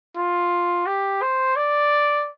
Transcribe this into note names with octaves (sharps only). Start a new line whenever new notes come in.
F4
G4
C5
D5